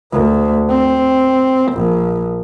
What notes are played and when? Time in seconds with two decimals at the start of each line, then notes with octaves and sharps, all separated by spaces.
0.12 D2
0.70 C4
1.73 A#1